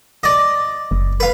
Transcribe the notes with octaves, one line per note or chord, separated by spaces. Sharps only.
D5 D#5
F#1
B4 F5